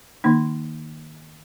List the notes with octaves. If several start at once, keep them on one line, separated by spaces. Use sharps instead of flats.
D#3 A#3 D#4